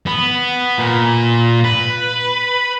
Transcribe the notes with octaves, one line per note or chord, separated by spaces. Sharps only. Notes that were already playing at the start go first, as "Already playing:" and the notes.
B3
A#2
B4